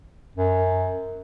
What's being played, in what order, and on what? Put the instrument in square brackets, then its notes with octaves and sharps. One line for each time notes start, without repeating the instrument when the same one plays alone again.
[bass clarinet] F#2